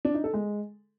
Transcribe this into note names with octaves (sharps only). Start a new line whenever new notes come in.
D4
D#4
A4
G#3